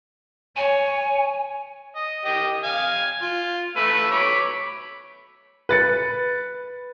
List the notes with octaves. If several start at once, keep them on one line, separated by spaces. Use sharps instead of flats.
C#5 G#5
D#5
G4 D#5
F5 G#5
F4
A3 B4 E6
C#5 B5 D6
B4 A6 C#7